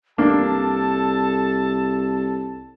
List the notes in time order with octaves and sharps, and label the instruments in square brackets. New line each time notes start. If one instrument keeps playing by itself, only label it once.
[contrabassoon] C2 [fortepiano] A#3 D4 [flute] A4 [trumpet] A5